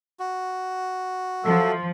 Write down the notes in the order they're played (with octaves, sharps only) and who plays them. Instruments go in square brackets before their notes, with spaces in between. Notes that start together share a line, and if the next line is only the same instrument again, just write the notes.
[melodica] F#4
[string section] F3 [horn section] F#3 A4 E5